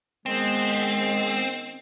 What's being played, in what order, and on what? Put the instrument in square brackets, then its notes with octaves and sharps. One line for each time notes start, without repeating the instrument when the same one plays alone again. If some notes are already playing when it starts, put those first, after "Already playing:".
[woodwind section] D#3 B3 [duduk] G#3 [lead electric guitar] C4